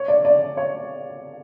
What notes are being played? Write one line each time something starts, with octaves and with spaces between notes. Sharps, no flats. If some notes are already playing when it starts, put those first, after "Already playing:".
Already playing: C#5
D5
D5
C#5